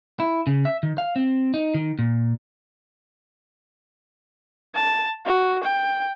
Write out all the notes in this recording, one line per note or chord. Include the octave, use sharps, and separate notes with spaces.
E4
C#3
E5
D#3
F5
C4
D#4
D#3
A#2
A5
F#4
G5